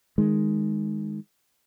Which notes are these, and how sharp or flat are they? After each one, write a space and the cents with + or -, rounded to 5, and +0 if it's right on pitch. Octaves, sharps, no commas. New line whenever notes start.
D#3 +0 G#3 +0